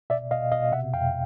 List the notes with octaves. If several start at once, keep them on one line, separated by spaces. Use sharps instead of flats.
B2 D5 E5
B2 D#5 F5
B2 D#5 F5
C3 E5 F#5
F2 F5 G5